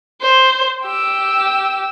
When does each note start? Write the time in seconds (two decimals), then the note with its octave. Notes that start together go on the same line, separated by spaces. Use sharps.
0.21 C5
0.83 G4 E6